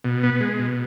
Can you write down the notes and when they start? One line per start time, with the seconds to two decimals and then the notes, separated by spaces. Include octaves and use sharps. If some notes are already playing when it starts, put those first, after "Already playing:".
0.04 B2
0.23 B3
0.41 G#3
0.59 B2